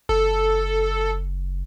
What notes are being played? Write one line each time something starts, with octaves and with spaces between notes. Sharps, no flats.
F#1 A4